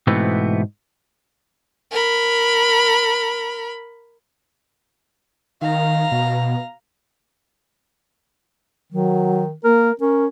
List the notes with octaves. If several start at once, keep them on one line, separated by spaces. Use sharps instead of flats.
G#2 B2 E3 A3 B3 C4
A#4 B5
D#3 F5 A#5
B2
D#3 F#3
A#3 A#4
C#4 A#4